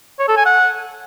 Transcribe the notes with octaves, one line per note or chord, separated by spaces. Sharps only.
C#5
A4
G#5
F#5